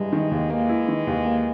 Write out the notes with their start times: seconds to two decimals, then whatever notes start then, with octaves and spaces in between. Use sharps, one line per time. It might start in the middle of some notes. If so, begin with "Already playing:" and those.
Already playing: G2 E3 G#3
0.13 D#3
0.31 D#2
0.50 E3 G#3 A#3
0.69 E4
0.88 D#3
1.07 D#2
1.25 A#3